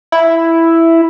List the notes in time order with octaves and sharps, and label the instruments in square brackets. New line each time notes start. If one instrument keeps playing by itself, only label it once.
[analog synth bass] E4